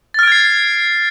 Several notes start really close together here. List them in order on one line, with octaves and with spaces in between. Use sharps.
A6 F6 D7 G#6 C7